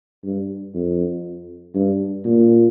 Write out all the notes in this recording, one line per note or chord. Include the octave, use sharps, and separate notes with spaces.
G2
F2
G2
A#2